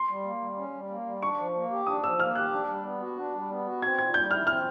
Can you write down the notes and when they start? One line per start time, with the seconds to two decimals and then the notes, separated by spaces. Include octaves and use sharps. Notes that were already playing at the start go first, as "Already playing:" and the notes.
Already playing: C6
0.08 G3
0.24 A#3
0.41 G3
0.57 C#4
0.73 G3
0.90 A#3
1.06 G3
1.22 D4 C#6
1.38 F3
1.55 A#3
1.71 G4
1.87 D4 D#6
2.03 F3 E6
2.20 A#3 F6
2.35 G4 F#6
2.52 D4
2.68 G3
2.85 B3
3.01 F#4
3.17 D4
3.34 G3
3.50 B3
3.66 F#4
3.82 C4 G#6
3.98 A#2 G#6
4.14 G3 G6
4.31 E4 F6
4.47 C4 F6